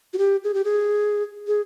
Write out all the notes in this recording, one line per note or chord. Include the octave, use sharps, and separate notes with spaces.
F#4
G4
G#4
G4
G#4
G#4